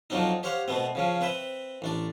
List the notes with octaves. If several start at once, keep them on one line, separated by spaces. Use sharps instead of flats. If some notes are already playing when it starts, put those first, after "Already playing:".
F2 F3 F#3 C4 D4 D#4
G4 C5 C#5 F5 F#5
B2 A3 B3 C4
C#3 F3 C#4
C4 B4 E5 G5
A1 D4 D5